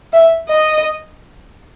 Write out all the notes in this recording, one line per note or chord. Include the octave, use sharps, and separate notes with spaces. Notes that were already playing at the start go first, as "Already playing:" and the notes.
E5
D#5